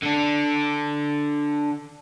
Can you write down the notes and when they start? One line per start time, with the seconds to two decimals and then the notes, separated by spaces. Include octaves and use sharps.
0.03 D3 D4